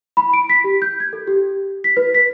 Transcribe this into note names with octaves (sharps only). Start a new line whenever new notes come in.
B5
D7
B6
G4
G6
G#6
A4
G4
B6
B4
B6